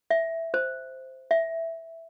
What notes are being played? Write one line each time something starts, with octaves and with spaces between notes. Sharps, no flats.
E5
C5
E5